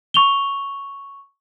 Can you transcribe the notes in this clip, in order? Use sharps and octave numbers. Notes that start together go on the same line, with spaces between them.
C#6 F7 G7